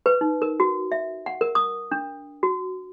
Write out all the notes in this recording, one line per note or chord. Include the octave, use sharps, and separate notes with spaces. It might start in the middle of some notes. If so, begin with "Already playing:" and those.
B4
D#4
A#4
F#4
E5
F#5
A#4
D#6
D4
F#4